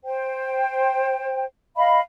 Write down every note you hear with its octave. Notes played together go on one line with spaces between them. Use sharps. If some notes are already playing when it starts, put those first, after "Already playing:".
C5 G5
D#5 F5 B5